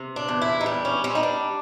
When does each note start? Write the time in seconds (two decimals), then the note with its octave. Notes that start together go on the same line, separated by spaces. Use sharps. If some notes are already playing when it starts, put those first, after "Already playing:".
Already playing: C3
0.16 D4
0.28 E2
0.41 E4
0.61 D#4
0.66 G3 D4
0.85 C#4
1.04 G3 C4
1.15 D#4
1.23 D4